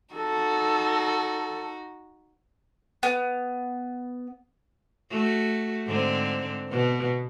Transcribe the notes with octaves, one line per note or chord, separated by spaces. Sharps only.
D#4 F#4 A4
B3
A3 F#4
G#2 D3 C4
B2 B3